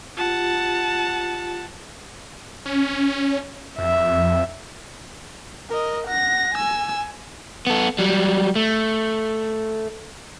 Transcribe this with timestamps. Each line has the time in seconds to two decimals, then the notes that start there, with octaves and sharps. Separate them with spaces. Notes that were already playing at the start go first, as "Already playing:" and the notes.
0.17 F4 G4 F#5 A5
2.66 C#4
3.78 F2 E5
5.70 A#4 D#5
6.07 F#5 A#6
6.54 G#5 E6
7.67 B3 A4
7.99 F#3 G3
8.56 A3